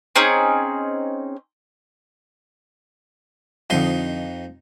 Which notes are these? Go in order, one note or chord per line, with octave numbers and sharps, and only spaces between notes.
C4 C#4 D#4 G#4
F2 D3 F3 D#4 D#5 C6